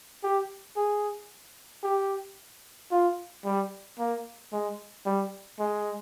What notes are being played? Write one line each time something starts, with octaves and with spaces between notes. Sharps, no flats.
G4
G#4
G4
F4
G3
A#3
G#3
G3
G#3